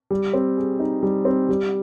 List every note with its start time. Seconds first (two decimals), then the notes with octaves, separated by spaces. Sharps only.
0.11 G3
0.34 C4
0.57 G#4
0.80 D#4
1.03 G3
1.25 C4
1.49 G3